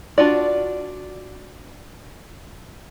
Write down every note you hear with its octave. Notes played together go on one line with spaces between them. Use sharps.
D4 F4 F#4 D5